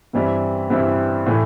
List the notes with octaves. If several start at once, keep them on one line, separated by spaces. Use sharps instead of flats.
G2 E3 G3 C4 E4
G2 E3 G3 C4 E4
A2 E3 A3